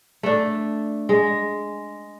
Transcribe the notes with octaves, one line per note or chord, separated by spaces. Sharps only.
A3 D4
G#3